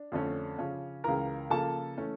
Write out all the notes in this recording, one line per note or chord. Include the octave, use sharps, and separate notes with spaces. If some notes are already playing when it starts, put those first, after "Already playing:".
Already playing: D4
F2 D3 A3 C#4
C#3 F3 C#4
C#2 C#3 E3 A#4 A#5
C#3 F3 A#3 A4 A5
E3 A3 C#4